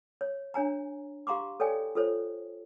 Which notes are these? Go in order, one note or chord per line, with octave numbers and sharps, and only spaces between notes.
C#5
D4 C#5 G#5 A#5
G4 F5 A#5 C6 D6
A4 C#5 D5 G5 G#5
F4 A4 C5 C#5